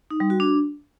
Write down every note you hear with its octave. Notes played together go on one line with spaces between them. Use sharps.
D#4
G3
F#4
D4